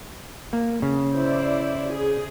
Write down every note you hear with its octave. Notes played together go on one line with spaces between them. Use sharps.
A#3
C#3
E4 C5 D5
G#4